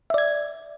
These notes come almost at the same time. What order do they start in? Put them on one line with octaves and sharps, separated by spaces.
E5 D5 G#6